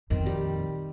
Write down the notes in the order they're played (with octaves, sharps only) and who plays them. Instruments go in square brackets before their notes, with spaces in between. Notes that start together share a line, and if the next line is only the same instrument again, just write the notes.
[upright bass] F2 A#2 [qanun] D#3 C4
[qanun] G3 G4